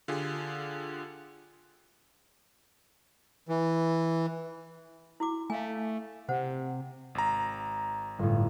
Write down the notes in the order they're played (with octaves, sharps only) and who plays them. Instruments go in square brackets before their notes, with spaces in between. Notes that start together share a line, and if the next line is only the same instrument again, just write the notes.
[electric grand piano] D3 F4 G4 G#4
[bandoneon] E3
[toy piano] E4 F#4 D6
[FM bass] A3 [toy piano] F5 G#5
[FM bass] C3 [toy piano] C5 F#5
[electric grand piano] G#1 A#5
[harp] G1 A2